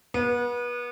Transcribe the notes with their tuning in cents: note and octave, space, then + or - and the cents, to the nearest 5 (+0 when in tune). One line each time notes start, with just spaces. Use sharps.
B3 -30